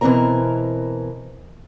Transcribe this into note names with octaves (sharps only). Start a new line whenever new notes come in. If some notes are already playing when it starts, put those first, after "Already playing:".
B2 E3 F3 C4 A#4 A#5